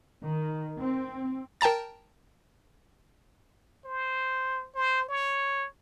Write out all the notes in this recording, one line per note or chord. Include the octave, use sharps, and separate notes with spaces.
D#3
C4
A#4 G5 A5 A#5 A6
C5
C5
C#5